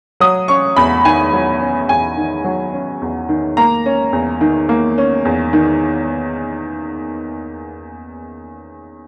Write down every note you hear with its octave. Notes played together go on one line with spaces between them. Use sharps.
F#3 D#6
C#4 C#6
E2 B5
D#3 G#5
F#3
C#4
E2 G#5
D#3
F#3
C#4
E2
D#3
A#3 A#5
C#4
E2
D#3
A#3
C#4
E2
D#3